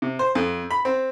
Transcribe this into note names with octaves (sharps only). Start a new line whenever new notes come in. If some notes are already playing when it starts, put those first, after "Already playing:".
C3
C5
F2
B5
C4